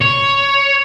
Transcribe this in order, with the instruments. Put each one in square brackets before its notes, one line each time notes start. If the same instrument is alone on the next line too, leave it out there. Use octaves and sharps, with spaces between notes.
[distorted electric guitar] C#5